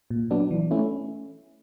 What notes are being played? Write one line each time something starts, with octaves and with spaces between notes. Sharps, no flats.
A#2
F#3 B3 D4
E3
A3 C#4 E4